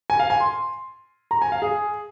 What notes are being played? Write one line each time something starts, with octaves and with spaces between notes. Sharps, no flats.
G#5
F5
G#5
C6
A#5
G#5
F5
G#4